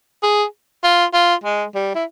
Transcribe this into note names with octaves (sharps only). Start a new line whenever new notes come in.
G#4
F4
F4
G#3
G3
E4